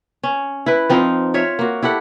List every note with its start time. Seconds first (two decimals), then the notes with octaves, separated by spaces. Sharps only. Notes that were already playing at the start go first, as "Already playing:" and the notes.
0.23 C#4
0.66 E4 B4
0.89 F3 C4 D#4 F4
1.34 F4 C#5 E5 F5
1.59 A#3 F#4
1.82 E4 G4 A4 F#5